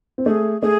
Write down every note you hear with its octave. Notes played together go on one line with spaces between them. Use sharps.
C4
A3 G#4
A3 G#4